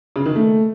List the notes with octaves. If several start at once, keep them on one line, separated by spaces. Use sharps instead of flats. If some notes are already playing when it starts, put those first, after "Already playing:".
C#3
D#3
A3